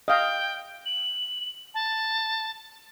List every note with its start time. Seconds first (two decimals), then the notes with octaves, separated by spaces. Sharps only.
0.08 D#5 F5 G5
0.86 F#7
1.74 A5